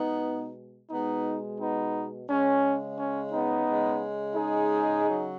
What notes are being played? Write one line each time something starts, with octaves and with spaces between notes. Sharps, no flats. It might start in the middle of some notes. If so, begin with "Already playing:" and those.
Already playing: B2 G#3 B3 D#4
B2 G#3 B3 D#4
B3 D#4
C#3 G#3 C#4
C#4
B3 D#4
C#3 G#3
D#4 G#4
C#3 F#3